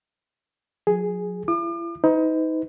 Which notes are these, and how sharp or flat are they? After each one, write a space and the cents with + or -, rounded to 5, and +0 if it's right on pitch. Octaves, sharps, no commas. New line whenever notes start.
F#3 -40 G#4 +0
E4 +40 D6 +45
D#4 +25 B4 +40